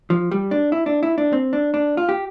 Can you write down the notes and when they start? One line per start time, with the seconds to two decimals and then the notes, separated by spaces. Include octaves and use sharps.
0.10 F3
0.31 G3
0.51 D4
0.72 E4
0.86 D4
1.03 E4
1.18 D4
1.33 C4
1.53 D4
1.74 D4
1.97 F4
2.09 G4